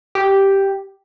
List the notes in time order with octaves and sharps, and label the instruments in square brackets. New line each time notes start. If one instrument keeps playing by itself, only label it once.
[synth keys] G4